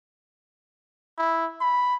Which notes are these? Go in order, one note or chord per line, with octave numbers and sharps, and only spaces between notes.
E4
B5